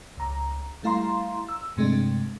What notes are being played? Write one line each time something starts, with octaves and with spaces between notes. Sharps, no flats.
C#2 A#5
G3 A3 E4 F5 A#5 C6
E6
G2 C3 G#3 A3 D4